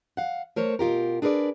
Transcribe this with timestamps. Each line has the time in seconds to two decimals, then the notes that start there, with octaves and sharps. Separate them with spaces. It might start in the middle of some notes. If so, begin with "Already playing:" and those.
0.17 F5 F#5
0.56 A3 A#4 C5 C#5
0.79 B2 F4 G4 A#4
1.22 D4 G#4 A#4 B4 D5